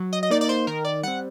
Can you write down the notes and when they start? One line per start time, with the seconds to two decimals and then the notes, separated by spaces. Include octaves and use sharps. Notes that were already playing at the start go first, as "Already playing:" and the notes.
Already playing: F#3
0.13 D#5
0.23 D#5
0.30 A#3 D#4 D5
0.41 D5
0.49 C5
0.67 D#3 A#4
0.85 D5
1.03 G3 C4 F#5